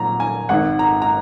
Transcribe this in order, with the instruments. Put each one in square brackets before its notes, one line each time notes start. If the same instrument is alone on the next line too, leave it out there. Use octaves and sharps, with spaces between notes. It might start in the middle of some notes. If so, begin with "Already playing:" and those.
Already playing: [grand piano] A#2 F#3 A#5
G#5
G#1 G#2 D#3 F#5
A#5
A#5